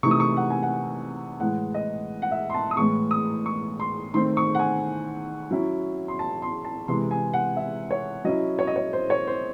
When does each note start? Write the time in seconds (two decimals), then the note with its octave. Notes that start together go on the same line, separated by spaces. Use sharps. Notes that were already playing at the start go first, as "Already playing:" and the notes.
0.03 C3 E3 A3 D#4 C#6
0.11 D#6
0.20 C#6
0.37 F#5
0.50 G#5
0.63 F#5
1.40 A2 E3 G#3 F#5
1.74 D#5
2.22 F#5
2.32 E5
2.50 C6
2.54 A5
2.71 D#6
2.77 A2 E3 G#3 C#6
3.11 D#6
3.46 C#6
3.80 C6
4.14 D#3 A3 C4 C6
4.37 C#6
4.55 F#5
4.59 G#5
5.51 F#3 C#4 E4
6.08 C6
6.19 A5
6.42 C6
6.65 A5
6.88 C3 E3 G#3 C6
7.11 G#5
7.33 F#5
7.57 E5
7.91 C#5
8.25 F#3 C#4 E4 D#5
8.59 C#5
8.67 D#5
8.76 C#5
8.93 C5
9.10 C#5
9.27 C5